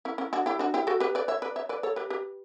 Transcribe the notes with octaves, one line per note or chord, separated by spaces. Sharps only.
C#4 E4
C#4 E4
D4 F#4
E4 G4
D4 F#4
E4 G4
F#4 A4
G4 B4
B4 D5
C#5 E5
B4 D5
C#5 E5
B4 D5
A4 C#5
G4 B4
G4 B4